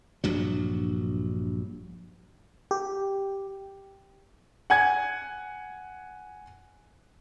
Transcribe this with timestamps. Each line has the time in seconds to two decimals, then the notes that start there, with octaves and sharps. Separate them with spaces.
0.24 A#1 G2 F#3
2.71 G4
4.70 F#5 G#5 G#6